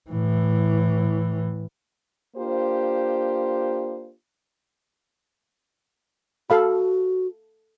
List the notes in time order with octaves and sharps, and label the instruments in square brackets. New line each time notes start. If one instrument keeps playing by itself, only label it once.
[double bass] A2 E3
[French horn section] A#3 D4 F4 G4 C5
[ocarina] F#4 [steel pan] A4 F5 B5